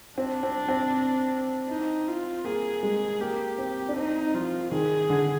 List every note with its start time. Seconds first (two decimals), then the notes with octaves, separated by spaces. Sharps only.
0.18 C4 D4
0.43 C4
0.68 C4
1.69 D#4
2.07 F4
2.45 A#3 G#4
2.83 G#3
3.20 A#3 G4
3.58 C4
3.89 D4
3.96 C4 D#4
4.34 F3 F4
4.72 D#3 G#4
5.10 D3